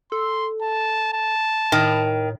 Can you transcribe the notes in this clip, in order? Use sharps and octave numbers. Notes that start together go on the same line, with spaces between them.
A4 C6
A5
A5
A2 D#3